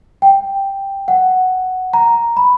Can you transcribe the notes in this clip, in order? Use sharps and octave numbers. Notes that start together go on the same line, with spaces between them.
G5
F#5
A#5
B5